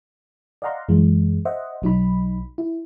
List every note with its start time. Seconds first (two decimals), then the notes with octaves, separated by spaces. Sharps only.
0.62 D5 D#5 F5 F#5 A#5 C6
0.88 F#2 E3 G#3
1.45 C5 D#5 E5 F#5
1.82 B1 F#3 D#4 B5
2.58 E4